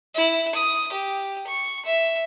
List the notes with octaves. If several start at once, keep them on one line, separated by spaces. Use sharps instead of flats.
E4
D#6
G4
C#6
E5